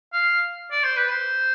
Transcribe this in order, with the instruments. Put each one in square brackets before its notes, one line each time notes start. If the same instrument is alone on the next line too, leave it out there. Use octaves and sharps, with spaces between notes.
[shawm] F5
D5
C5
B4
C5